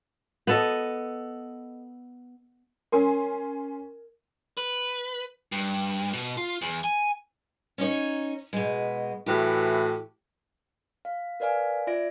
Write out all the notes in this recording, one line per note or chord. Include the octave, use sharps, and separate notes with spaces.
B3 A4 D#5
C#4 A#4 G#5 C6
B4
G2
B2
F4
E2
G#5
C#4 D#4 C#5
B2 G#3
A2 E3 F#4 G4
F5
A#4 B4 D5 F5 G#5
F4 D5 E5 A#6 D7